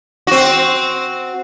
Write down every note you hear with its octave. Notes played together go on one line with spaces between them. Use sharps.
C4 F#4